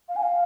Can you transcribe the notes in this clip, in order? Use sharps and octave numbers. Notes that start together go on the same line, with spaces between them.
F5
G#5
F5